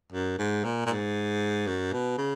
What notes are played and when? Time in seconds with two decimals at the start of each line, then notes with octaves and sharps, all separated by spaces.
0.12 F#2
0.38 G#2
0.64 A#2
0.86 A#2
0.89 G#2
1.67 F#2
1.93 B2
2.18 C#3